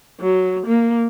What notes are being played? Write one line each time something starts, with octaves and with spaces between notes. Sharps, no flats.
F#3
A#3